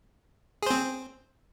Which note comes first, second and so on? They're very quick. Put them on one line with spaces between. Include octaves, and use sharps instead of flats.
G#4 C5 C4